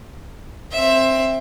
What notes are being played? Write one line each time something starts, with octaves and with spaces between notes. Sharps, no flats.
C4 E5